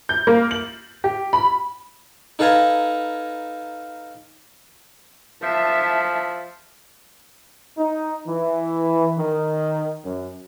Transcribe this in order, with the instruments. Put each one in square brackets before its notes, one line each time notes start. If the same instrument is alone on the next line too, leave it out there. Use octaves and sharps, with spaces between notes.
[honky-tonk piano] G6
A#3
F#7
G4
B5
[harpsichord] D#4 A4 B4 F5 G#5 A#5
[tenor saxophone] F3 [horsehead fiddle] E5 A5
[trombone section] D#4
E3
D#3
F#2